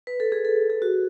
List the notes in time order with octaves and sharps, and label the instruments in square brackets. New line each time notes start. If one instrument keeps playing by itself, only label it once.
[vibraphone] B4
A4
G#4
A4
G#4
F#4